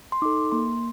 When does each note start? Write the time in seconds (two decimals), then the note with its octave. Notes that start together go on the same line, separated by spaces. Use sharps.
0.12 C6
0.22 D#4 A4 D6
0.52 A#3 C6